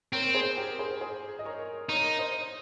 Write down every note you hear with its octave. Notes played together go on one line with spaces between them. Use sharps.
C4 A#4 C#5
G#4 C5
G4 A#4
G#4 C5
G#4 C5
D#5
A#4 C#5
D#4 A#4 C#5
C5 D#5